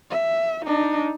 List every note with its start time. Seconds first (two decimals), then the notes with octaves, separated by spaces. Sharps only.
0.10 E5
0.66 D4 D#4